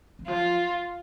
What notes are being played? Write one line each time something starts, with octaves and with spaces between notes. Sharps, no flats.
D#3
F3 F4